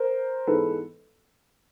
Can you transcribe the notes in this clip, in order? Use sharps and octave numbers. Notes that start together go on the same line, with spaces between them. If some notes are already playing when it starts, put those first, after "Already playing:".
Already playing: A#4 C5
G#2 E3 G#3 B3 A4 B4